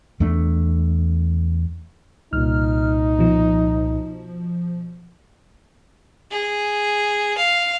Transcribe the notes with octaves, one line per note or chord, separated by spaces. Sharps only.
E2 A3 D4
C2 A#2 D#4 F6
B2 F3
G#4
F5